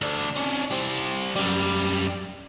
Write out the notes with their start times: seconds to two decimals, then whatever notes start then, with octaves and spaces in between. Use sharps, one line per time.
0.01 D2 D4
0.37 C#4 D4
0.71 G3 C4
1.36 F#2 G3